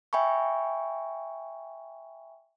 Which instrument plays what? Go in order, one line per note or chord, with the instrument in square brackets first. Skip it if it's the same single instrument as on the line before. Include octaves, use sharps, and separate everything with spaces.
[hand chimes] E5 G5 G#5 B5 C#6